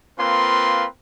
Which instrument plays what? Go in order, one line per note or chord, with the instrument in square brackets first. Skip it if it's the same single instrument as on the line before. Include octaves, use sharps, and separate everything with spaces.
[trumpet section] A#3 C4 F4 B4 C6